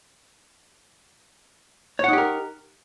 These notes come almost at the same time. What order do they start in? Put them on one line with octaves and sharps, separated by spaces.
C#5 F#5 D#4 G4 A#4